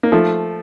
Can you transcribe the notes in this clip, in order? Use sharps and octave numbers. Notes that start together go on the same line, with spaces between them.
A#3
F3 A3